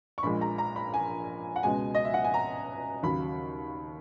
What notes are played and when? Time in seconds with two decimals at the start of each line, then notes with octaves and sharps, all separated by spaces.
0.18 C#6
0.23 A#1 A#2 G#3 B5
0.41 A#5
0.58 A#5
0.76 B5
0.94 G#5
1.56 F#5
1.63 C#2 B2 G#3 G#5
1.95 D#5
2.05 E5
2.14 F#5
2.24 G#5
2.34 A#5
3.03 D#2 C#3 F#3 B5